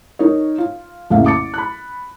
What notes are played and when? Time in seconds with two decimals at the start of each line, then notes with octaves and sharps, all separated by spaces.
0.19 D#4 A#4 C#5
0.58 F4
1.10 A1 F2 C#3 A#3 E5 F5
1.26 D6 A6 C#7
1.54 B5 F#6